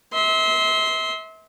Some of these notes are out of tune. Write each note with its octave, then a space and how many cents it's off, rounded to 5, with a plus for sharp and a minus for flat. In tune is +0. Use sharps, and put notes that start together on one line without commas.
E5 -35 C6 +0